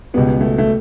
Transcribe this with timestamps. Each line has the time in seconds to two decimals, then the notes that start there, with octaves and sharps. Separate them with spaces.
0.14 C#2 B2 G3 B3
0.41 A3
0.58 A3